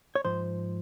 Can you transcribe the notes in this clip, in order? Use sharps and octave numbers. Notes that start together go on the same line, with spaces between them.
C#5
G#2 F3 C5